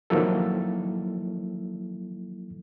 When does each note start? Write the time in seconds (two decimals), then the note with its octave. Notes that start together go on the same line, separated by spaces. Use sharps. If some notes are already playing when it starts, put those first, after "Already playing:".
0.10 D#3 F3 F#3 A#3 E4 A4